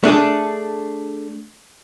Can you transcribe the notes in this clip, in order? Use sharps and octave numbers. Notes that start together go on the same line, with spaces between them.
A3 D4 G#4 A4